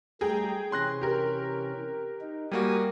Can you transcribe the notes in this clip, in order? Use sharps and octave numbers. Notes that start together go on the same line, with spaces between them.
G3 A3 G#4 G5 A#5
C3 E3 C#4 C6 F#6 A#6
G4 A#4
D#4
G3 A#3 F#4 G#5 D#6